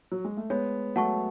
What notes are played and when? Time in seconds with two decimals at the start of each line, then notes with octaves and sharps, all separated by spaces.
0.12 F#3
0.25 G#3
0.37 A3
0.50 G#3 B3 C#5
0.96 F#3 A3 F#5 A5 C#6